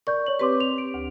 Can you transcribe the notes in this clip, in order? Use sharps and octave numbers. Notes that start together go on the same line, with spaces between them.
A#4 D5 C#6 G6
C#5 F#7
C4 G4 B4 C#5 C6 D6
F7
D7
D2